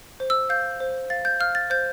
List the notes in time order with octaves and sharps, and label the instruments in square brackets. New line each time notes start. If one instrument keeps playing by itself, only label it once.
[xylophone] C5
E6
F5 G6
C5
F5 A6
G6
F5 F6
A6
C5 G6